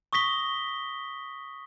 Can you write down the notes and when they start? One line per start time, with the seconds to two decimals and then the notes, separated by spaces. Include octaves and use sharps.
0.13 C#6 D#6 A#6 B6 G7